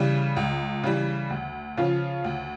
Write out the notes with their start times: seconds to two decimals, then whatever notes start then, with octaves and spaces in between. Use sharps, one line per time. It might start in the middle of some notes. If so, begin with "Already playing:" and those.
Already playing: C#3 E3 G3
0.36 C#2
0.83 C#3 E3 G3
1.30 D2
1.77 C#3 F3 C#4 F4
2.24 D2